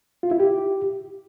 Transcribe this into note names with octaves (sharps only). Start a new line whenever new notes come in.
F4
E4
G4